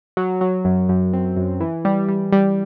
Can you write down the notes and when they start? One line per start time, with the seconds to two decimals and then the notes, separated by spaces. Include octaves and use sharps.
0.17 F#3
0.41 F#3
0.65 F#2
0.89 F#2
1.13 C4
1.37 F#2
1.60 E3
1.85 G3
2.08 G3
2.32 G3